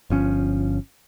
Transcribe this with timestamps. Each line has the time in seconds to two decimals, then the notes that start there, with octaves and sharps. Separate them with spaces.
0.10 G1 F3 C#4